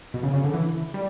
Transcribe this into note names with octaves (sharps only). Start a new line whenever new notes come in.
B2
C#3
C#3
D3
E3
G3